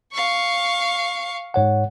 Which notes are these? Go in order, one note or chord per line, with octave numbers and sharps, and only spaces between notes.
F5 C#6
G#2 C#5 F#5